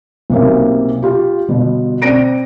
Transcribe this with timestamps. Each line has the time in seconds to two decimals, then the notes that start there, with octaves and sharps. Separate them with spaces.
0.30 B1 C3 A#3
1.03 F4 G4
1.49 G1 B2
2.02 C4 D5 A#6 D7 D#7